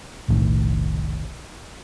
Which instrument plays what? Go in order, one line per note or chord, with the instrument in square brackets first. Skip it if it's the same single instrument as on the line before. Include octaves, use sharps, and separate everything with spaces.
[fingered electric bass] F1 B1 A2 D#3